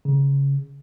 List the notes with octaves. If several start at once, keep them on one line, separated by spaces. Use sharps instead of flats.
C#3